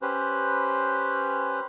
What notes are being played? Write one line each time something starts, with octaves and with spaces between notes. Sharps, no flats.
C#4 G4 B4 C5